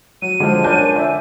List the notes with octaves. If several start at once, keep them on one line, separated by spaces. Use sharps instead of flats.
F#3 D#7
D3 F3 G#3
C#4 D4 A#4 D5 G#5 G6
D5 E5